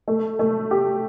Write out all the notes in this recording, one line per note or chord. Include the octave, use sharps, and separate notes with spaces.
A3
A3
G4